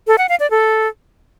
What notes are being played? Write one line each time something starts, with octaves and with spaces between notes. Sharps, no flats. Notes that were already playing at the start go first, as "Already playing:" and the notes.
A4
F#5
F5
D5
A4